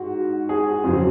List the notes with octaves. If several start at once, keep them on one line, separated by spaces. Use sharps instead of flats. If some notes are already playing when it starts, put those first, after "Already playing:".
Already playing: G#2 F#4
G#4
F2 C#3 F#3 C4